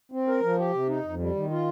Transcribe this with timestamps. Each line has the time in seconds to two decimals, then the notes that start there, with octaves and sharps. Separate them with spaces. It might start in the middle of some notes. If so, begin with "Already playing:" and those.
0.12 C4
0.27 A#4
0.43 F3
0.59 G4
0.73 C3
0.88 D#4
1.05 F2
1.19 G3
1.35 D#3
1.51 F4